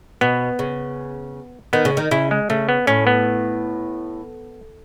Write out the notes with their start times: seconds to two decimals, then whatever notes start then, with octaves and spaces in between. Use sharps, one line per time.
0.21 B2 B3
0.59 C#3
1.73 D#3 B3
1.85 C#3
1.97 D#3
2.11 C#3 E4
2.31 G#3
2.50 C#3 A3
2.69 B3
2.87 A2 C#4
3.07 B3